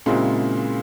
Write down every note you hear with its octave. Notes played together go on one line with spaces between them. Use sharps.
A#2 C#3 G#3 C4 E4 F#4